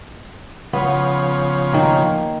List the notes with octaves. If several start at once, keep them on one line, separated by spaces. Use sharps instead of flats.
C#3 F3 B3
D#3 A#3